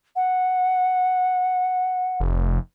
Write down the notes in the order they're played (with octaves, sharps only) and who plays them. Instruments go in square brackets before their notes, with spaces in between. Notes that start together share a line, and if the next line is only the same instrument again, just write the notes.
[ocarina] F#5
[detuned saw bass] F1